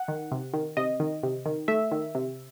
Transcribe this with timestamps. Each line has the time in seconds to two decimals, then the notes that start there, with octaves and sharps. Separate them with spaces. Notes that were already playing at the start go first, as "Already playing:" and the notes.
Already playing: F#5
0.08 D#3
0.32 C3
0.54 D#3
0.77 C3 D#5
1.00 D#3
1.23 C3
1.46 D#3
1.68 A3 E5
1.92 D#3
2.15 C3